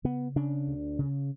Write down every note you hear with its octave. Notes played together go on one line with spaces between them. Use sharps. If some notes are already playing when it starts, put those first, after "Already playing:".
C#3 B3
C#3 D4
D2
C#3